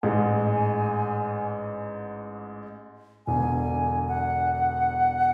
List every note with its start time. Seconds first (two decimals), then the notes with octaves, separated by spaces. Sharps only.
0.03 A1 G#2 G#3 G#5
3.26 E1 E2 D3 G#5
4.08 F#5